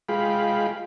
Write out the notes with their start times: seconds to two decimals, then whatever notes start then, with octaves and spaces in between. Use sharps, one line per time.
0.09 G#3 F4 G#4 F5 G5 B5